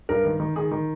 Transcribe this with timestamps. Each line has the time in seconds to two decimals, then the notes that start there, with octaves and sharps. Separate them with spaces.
0.09 G2 A#4
0.25 D#3
0.40 D#3
0.56 D#3 G#4
0.71 D#3